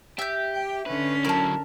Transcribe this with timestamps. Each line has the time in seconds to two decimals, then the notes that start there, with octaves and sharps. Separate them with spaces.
0.19 G4 E5 G6
0.54 G5
0.86 D3 C#4 B4
1.25 F#3 E4 A#4 A5